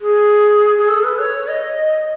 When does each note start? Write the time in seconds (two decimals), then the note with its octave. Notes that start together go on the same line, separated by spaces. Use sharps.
0.01 G#4
0.78 G#4
0.89 A4
1.04 B4
1.19 C#5
1.48 D#5